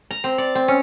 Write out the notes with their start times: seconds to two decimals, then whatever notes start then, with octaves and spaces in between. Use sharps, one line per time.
0.11 A#5
0.24 C4
0.38 D5
0.55 C4
0.68 C#4